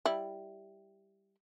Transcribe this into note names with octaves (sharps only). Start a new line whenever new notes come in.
G3 E4